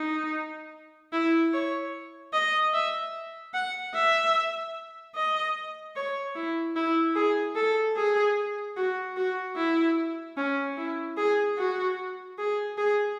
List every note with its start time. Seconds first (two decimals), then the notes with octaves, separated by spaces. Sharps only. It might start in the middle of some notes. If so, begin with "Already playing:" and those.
Already playing: D#4
1.13 E4
1.53 C#5
2.34 D#5
2.74 E5
3.54 F#5
3.95 E5
5.15 D#5
5.96 C#5
6.35 E4
6.76 E4
7.16 G#4
7.56 A4
7.96 G#4
8.76 F#4
9.17 F#4
9.56 E4
10.37 C#4
10.77 E4
11.17 G#4
11.58 F#4
12.39 G#4
12.78 G#4